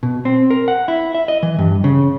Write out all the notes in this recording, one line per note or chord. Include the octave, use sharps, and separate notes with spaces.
B2
C4
A#4
F#5
E4
E5
D#5
E3
G2
C#3